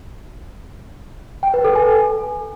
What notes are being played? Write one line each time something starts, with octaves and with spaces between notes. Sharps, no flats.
G5
B4
A4
G#5